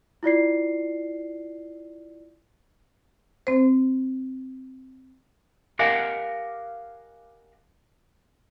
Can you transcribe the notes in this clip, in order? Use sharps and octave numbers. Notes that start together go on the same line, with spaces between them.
E4 F4 D5 C7
C4 C5
G4 A#4 D#5 F5 F#5 G#5